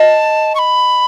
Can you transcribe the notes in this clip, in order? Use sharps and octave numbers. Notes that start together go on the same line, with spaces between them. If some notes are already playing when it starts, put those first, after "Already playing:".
Already playing: D#5 A5
C#6
B5